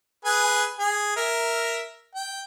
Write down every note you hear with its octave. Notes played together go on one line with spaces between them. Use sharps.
G#4 B4 G#5
G#4 G#5
A#4 E5
G5